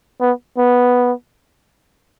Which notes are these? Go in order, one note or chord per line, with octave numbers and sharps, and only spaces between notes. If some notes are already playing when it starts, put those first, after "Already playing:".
B3
B3